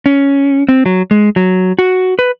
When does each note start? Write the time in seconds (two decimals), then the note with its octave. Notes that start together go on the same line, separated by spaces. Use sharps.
0.06 C#4
0.69 C4
0.86 F#3
1.11 G#3
1.36 F#3
1.79 F#4
2.19 B4